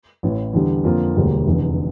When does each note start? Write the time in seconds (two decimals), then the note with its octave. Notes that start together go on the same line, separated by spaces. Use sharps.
0.23 A1 A2 E3
0.53 E2 D3 G3
0.84 F2 D3 F3 A#3 F4
1.15 E1 D2 D3 G3 A#3
1.47 F1 E2 D3